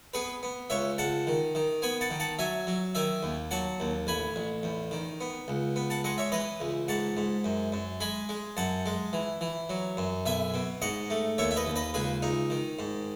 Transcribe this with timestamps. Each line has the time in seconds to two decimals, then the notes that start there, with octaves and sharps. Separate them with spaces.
0.14 B3 G#4 B4
0.43 B3
0.70 C#2 C#5 E5
0.98 C#2 F#5 A5
1.27 D#3
1.55 D#3
1.82 B3 G#5 B5
2.01 F#5 A5
2.11 D#3
2.20 F#5 A5
2.39 F#3 E5 G#5
2.67 F#3
2.95 D#3 E5 G#5
3.23 D#2
3.51 F#3 F#5 A5
3.80 D#2
4.07 A1 G#5 B5
4.36 A1
4.63 E2
4.91 D#3
5.21 B3
5.48 C#2
5.76 B3
5.90 F#5 A5
6.04 G#3 D#5 F#5
6.18 C#5 E5
6.32 E3 B4 D#5
6.60 C#2
6.88 G#2 F#5 A5
7.17 G#2
7.44 F#2
7.72 F#2
8.01 G#3 G#5 B5
8.29 G#3
8.57 F#2 F#5 A5
8.86 G#3
9.13 E3
9.41 E3
9.70 F#3
9.97 F#2
10.26 B1 E5 G#5
10.54 B2
10.82 G#2 D#5 F#5
11.10 A3
11.38 D#2 C#5 E5
11.51 E5
11.57 B4 D#5
11.66 D#2
11.76 B4 D#5
11.94 C#2 G#4 B4
12.22 C#2 D#4
12.50 D#3
12.79 G#2